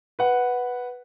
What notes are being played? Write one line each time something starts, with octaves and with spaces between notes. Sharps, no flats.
B4 F#5